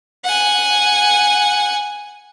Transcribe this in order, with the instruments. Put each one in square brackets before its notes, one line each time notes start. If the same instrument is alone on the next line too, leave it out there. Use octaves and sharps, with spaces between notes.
[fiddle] F#5 G#5